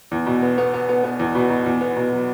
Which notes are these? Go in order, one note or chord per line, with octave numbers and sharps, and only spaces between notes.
E2
B2
B3
B3
B3
B3
B3
E2
B2
B2
E2
B3
B2
F#3